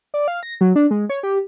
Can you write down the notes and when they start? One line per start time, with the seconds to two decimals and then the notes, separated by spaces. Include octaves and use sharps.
0.14 D5
0.28 F5
0.43 A#6
0.61 F#3
0.76 D4
0.91 G#3
1.09 C#5
1.23 G4